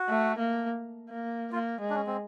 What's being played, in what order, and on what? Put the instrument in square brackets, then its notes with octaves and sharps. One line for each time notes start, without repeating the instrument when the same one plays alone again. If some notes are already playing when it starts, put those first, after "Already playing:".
Already playing: [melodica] F#4
[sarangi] A3
A#3
A#3
[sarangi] A#3 [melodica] F4
[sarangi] G#3
[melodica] D4
C#4
C4